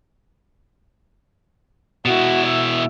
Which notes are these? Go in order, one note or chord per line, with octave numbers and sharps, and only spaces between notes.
B2 E4 F#4
E5